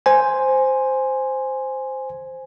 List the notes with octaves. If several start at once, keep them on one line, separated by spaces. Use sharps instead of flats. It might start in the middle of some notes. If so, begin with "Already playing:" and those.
C5 G#5